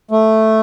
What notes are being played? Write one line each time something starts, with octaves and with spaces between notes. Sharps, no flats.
A3